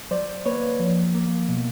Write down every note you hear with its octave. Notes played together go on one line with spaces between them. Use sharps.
F#3 C5 D5
A#3 B4 C#5
F3
A#3
B2